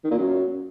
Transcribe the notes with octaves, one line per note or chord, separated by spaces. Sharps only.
D#3
A#2
F#2